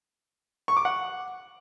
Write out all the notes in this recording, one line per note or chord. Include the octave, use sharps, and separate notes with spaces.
C#6
D6
F#5